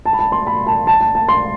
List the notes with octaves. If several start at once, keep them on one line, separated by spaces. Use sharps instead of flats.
A5
B5
A5
C6
B5
A5
A5
A5
A5
C6